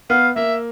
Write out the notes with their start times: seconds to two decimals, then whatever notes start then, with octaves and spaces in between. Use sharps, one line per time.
0.10 B3 F5
0.36 A#3 E5